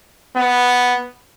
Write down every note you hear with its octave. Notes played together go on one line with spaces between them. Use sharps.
B3